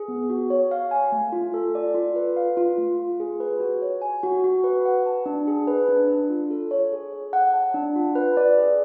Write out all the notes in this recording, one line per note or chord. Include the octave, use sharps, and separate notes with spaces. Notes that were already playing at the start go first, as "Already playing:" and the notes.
Already playing: G#4
B3
F#4
C#5
F5
G#5
A3
F4
A4
D5
F4
B4
F5
F4
A3
F4
G#4
B4
F#4
C#5
G#5
F#4
F#4
B4
F#5
A5
D4
G#4
B4
D4
D4
F4
A4
C#5
G#4
C#5
F#5
A5
D4
F4
B4
D5
G#4